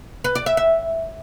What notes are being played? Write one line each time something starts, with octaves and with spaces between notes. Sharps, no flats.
B4
D5
E5
E5